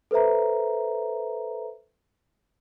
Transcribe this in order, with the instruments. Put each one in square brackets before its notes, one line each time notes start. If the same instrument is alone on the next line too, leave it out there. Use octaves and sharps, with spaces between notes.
[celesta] A4 B4 C5 E5 A#5